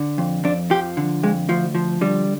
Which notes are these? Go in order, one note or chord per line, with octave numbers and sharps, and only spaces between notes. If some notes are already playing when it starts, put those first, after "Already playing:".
Already playing: D3
F2
F2 D4
F3 G4
D3
F2 G#3
D2 F3
F3
D3 G3